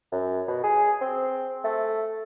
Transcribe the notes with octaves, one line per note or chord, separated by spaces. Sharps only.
F#2
B2
G#4
C4
A3